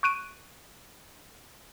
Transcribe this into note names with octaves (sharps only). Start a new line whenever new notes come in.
C#6 F#6 D7 D#7